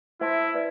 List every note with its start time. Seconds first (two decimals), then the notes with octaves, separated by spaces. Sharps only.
0.20 E4 C5 E5 A5 C6
0.54 B4 D5